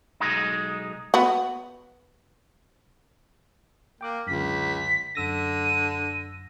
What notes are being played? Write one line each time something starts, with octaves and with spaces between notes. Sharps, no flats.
B1 G#3 D#4
B3 F#4
A#3 G5 D6 F#6
C#2 F#2 D3 B6
F#2 D3 E6 A#6 D#7